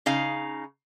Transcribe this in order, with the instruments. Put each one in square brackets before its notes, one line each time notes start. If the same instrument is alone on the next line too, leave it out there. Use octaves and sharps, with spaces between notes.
[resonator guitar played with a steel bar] C#3 D#4 F5